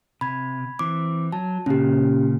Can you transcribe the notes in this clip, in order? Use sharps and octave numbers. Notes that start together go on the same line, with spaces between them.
C3 B5 G#6
E3 C4 D6
F#3 A5
A#2 C#3 C#4 G4